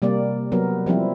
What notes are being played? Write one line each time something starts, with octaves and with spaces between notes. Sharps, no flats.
C3 G3 A#3 D5
F#3 B3 A#4
F3 G3 C4 E4